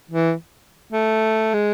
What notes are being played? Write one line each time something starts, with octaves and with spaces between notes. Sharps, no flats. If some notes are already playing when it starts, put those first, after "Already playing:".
E3
A3
G#3